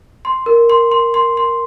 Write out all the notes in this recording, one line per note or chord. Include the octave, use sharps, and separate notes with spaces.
C6
A#4
C6
C6
C6
C6